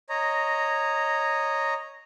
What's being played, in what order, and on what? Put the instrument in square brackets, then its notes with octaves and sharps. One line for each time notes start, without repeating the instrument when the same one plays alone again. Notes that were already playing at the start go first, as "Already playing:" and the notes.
[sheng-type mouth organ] C#5 D#5 A#5